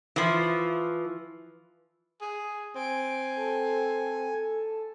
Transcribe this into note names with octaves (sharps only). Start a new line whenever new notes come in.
E3 F3
G#4
C4 G#5 D7
A4